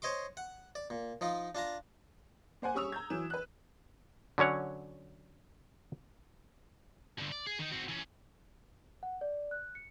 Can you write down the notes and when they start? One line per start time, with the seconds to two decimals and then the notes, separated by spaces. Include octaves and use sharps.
0.02 C5 C#5 D#5 C6 D6
0.37 F#5
0.75 D5
0.90 A#2
1.21 F3 D#4 F4
1.55 D4 F4 A5 A#5
2.62 A#3 C5 F#5 G#5
2.74 G3 C#4 C#6 D#6 E6 F7
2.92 A#5 G6 G#6
3.10 E3 F#3 E7
3.30 B4 F#6
4.38 D3 F#3 C#4 C#5 F#5
7.19 G2 D3
7.32 D5
7.47 G#4
7.59 D#3 D#4
7.72 C4 F#4
7.89 E3 C#4
9.03 F#5
9.21 D5
9.51 F#6
9.75 C#7